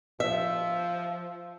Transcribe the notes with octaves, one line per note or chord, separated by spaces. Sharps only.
F3 E5